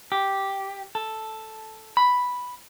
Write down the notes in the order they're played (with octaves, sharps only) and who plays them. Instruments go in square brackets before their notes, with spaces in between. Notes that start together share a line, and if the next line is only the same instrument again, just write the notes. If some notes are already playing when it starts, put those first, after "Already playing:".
[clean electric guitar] G4
A4
B5